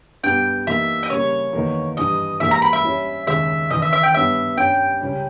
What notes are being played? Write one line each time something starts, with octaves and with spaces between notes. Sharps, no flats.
G2 G3 B3 G4 G5
E3 A#3 D#4 G4 E5
D#5
C#3 G3 A#3 C#4 C#5
E2 D#3 A#3 D#4
G2 E3 G3 D#5
G#2 E3 G3 A#3 E5
A#5
B5
E5
G3 C#4 E4
D#2 C#3 G#3 E5
D#2 C#3 E3 D#5
E5
E5
G5
G2 G3 B3 G4 C#5 E5
G2 G3 C#4 G5
C#2 C#3 G3 C#4